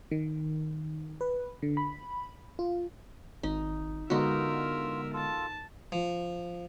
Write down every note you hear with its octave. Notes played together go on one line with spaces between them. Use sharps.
D#3
B4
D3
B5
F4
G#1 D#4
D3 G#3 B3 D#4 F4 F#4 A#4 E5
F4 A4 A5
F3